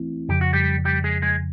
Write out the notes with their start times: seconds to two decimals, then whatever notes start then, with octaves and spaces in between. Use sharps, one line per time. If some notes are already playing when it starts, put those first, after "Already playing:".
Already playing: E3 A3 C4 E4
0.29 F2 C#3 F3 G4
0.41 F#4
0.53 G3 G4
0.85 G3 G4
1.04 G#3 G#4
1.22 G#3 G#4